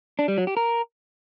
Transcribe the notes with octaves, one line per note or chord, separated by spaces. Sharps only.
D4
G3
F#3
G4
A#4